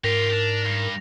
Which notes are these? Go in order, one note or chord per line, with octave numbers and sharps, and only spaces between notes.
G#2 F4 G4 A#4 A#6 F7
D4
G2